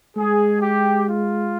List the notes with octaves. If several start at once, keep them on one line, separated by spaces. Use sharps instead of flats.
G#3 G#4
G4
F4